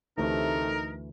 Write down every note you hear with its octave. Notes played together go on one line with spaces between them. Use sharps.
D2 C3 E3 A3 D#4 A#4